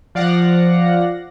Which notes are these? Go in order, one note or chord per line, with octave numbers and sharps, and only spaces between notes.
F3 D5 F5 F#5 A#6